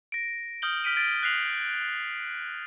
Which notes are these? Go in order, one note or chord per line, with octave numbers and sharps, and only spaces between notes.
A#6 D7
D#6 F6 G6 F#7 G7
F6 B6 D7 D#7
G#6 A6 D7
F#6 B6 C7 F7 F#7